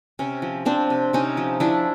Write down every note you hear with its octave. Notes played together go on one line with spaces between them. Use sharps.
C3 C#4
F3
F3 C4 D4
C3
C3 C#4 D#4
F3
F3 D4 E4